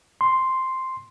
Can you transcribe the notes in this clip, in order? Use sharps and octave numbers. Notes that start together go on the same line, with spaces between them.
C6